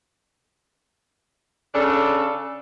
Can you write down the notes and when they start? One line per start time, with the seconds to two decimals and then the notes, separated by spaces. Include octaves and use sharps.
1.75 C#3 D4 A4